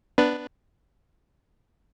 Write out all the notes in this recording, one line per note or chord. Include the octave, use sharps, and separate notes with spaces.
B3 D4 B4